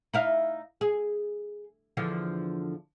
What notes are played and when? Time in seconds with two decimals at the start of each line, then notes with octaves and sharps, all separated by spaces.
0.14 D#4 E4 F5
0.81 G#4
1.97 E2 D3 F3